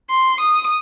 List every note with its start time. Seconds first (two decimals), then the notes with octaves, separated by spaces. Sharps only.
0.10 C6
0.40 D#6